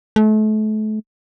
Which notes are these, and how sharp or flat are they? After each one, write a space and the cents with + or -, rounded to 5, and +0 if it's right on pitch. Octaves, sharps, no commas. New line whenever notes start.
A3 -35